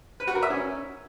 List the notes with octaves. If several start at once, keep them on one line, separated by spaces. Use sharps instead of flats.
B4
F#4
A#4
E5
C#4